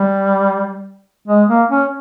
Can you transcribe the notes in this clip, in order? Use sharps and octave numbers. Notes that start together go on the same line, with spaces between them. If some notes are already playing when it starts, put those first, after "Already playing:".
Already playing: G3
G#3
A#3
C#4